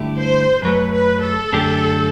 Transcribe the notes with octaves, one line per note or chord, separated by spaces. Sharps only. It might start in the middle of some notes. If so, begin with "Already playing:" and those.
Already playing: G2 D3 A3 E4 G4
C5
F#2 F#3 A3 B4
B4
A4
F#2 D3 A3 D4 G4